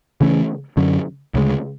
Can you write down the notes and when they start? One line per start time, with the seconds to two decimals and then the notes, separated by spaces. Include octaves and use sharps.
0.21 C#3 E3 A3 C#4
0.77 F#2 D3 F#3 C#4
1.34 D2 C#3 G#3